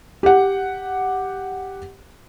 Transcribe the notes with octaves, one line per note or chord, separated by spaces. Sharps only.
G4 F#5